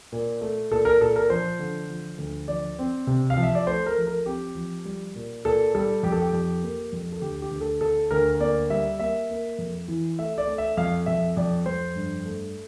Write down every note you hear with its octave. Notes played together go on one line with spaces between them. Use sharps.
A#2
A3
A#2 A4
A#4
A#2 A4
A#4
F3 C5
D3
F3
D2
F3 D5
C4
C3
F5
F3
E5
D5
A3 C5
A#4
F3
A#4
C4 G4
F3
G3
A#2
A#2 A4
G3 A4
F2 G4
A4
G4
F2
A#3
F2
A4
D2 G4
G4
D2
A4
D3 A4
D2 A#4
A#3 D5
G3 E5
A#3 E5
A#3
F2
E3
A3 E5
D5
A3
E5
F2 F5
F2 E5
F2 D5
F2 C5
G2
A3